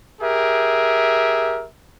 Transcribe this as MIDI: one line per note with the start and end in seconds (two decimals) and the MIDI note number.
0.21 1.65 67
0.21 1.65 68
0.21 1.65 70
0.21 1.65 76